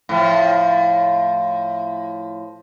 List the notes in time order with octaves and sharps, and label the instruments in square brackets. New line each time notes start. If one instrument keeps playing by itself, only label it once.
[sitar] A2 F3